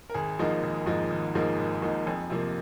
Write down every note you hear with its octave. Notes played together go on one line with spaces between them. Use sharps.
A#4
G#1 G#4
G#2 F3 A#3 D#4
G#1
G#2 F3 A#3 D#4
G#1
G#2 F3 A#3 D#4
G#1
G#2 F3 A#3 D#4
F2 G#4
C3 F3 A#3